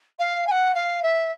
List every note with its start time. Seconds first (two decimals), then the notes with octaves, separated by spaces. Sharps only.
0.19 F5
0.46 G#5
0.51 F#5
0.74 F5
1.02 E5